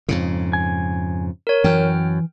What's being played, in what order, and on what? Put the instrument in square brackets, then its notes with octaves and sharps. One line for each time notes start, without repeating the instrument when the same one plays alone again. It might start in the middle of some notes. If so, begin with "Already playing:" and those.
[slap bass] F2 G#2 C#3
[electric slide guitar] G#5
[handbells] A#4 C#5
[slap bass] F#2 [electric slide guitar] E3 [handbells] G5 F6